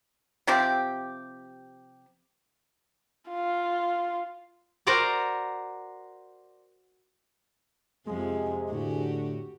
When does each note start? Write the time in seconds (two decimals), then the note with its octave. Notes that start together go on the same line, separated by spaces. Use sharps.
0.47 C3 F3 C4 G4
3.30 F4
4.87 F#4 A#4 C5 D5 F#5 A#5
8.07 F2 C3 F3 G#3 G#4
8.71 A2 D3 F#4 G4